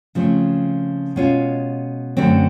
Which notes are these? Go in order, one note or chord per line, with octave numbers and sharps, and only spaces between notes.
C#3 F3 A3 C4
B2 G#3 C#4 F4
F#2 D3 F#3 A3 C4